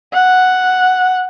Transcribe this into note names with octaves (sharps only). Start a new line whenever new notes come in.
F#5